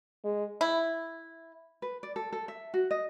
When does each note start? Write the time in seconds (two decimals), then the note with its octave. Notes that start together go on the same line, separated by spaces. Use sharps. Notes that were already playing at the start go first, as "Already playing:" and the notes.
0.25 G#3
0.61 E4
1.82 B4
2.03 D5
2.16 A4
2.33 A4
2.48 E5
2.74 F#4
2.91 D#5